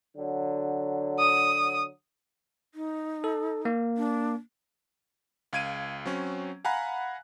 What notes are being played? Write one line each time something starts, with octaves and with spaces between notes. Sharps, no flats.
D3 F#3
D#6
D#4
A4
A#3
D4
C#2 F5 G#6 D7 D#7
F#3 C4 C#4
F5 F#5 G#5 A#5 B5 F#6